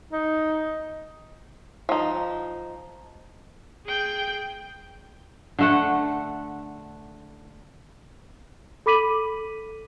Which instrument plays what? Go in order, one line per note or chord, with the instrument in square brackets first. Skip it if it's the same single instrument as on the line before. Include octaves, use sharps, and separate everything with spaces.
[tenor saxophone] D#4
[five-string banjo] F3 D#4
[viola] G#4 G5
[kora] D3 A3 F#5
[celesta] A4 B5 D6 B6 D#7 F#7